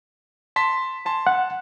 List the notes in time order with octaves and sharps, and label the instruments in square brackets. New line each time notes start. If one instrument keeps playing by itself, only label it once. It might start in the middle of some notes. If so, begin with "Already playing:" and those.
[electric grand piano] A5 C6 B6
G#5 A5 C6
[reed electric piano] F#5